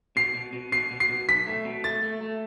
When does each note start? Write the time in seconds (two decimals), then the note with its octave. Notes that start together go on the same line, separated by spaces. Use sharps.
0.16 B2 C7
0.35 B2
0.53 B2
0.72 B2 C7
0.91 B2
1.00 C7
1.09 B2
1.28 B1 B6
1.47 A3
1.65 B2
1.84 A3 A6
2.02 A3
2.21 A3